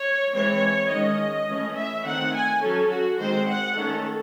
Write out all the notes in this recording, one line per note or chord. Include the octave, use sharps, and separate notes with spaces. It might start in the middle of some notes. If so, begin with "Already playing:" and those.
Already playing: C#5
E3 G#3 C4 C#5
D#3 G#3 C#4 D#5
E3 A3 C#4
E5
D#3 A3 C4 F#5
G#5
F#3 C#4 A4
F#4
D#3 G#3 C4 C5
F#5
D#3 A3 C#4 A4